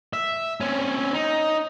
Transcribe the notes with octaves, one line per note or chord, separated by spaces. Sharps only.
E5
C4 C#4
D#4